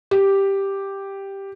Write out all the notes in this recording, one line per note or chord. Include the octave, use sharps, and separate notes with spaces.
G4